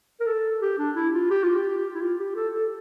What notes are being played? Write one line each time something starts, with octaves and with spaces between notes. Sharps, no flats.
A#4
A4
G4
D4
E4
F4
G4
F4
G4
E4
F4
G4
A4
A4